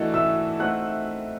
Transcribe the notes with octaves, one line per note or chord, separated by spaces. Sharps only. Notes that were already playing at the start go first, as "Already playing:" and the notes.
Already playing: E3 A3 D4 F#4 A4 D#5
E5 E6
A3 C4 D#4 F#5 F#6